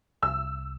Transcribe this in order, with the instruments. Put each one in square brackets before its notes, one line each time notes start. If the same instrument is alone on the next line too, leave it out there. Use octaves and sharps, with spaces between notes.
[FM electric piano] C2 [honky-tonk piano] E6